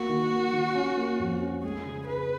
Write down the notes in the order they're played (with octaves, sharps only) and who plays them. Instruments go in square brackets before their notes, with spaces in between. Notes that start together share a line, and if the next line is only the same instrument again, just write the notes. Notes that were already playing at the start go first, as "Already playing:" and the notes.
Already playing: [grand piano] A#3 [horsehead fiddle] F#4
[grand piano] D#3
A#3
D#3
C#4
A#3
F2
C#4
[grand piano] G#3 [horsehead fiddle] G#4
[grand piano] C#3
[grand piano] G#4 [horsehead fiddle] B4